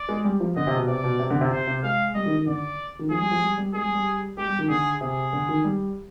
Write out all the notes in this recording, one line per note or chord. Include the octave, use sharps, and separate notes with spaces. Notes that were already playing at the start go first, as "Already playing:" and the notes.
Already playing: D5
G#3
G3
F3
D3 D#5
C3
B2
C3 D5
B2
C3
D3
C3
C3 C5
C3
G#3 F5
G3 D#5
D#3
D#3
D3 D5
D#3
F3 G#4
G3
F3
G3
G3
G#3 G#4
G3
G3
G#3 G4
G3
D#3
D3 G#4
C3 G#4
D3
D#3
G3